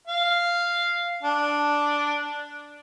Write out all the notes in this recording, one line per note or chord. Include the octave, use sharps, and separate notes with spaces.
F5
D4